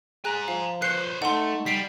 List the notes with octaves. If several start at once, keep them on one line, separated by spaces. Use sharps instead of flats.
G#4 G#5 A#5 F#6
F3 F5
B4 C5 F#6 C7 C#7
A3 D#4 F#5 C6
G3 B6 C7 D7